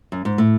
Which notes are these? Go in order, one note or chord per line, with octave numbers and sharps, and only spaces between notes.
F#2
G#2
A2